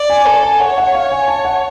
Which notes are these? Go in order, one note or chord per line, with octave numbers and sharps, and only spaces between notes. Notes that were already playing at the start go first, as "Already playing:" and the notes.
Already playing: D5
G#5
A4 G#5
G#5
C#5 F#5
F#5
F5
G#5
A5
F#5